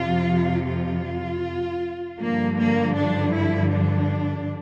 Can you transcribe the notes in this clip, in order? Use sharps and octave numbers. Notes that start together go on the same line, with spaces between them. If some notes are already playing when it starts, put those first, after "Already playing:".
Already playing: F2 C3 F3 F4
F4
G2 D3 F3 A#3
A#3
D4
E4
D4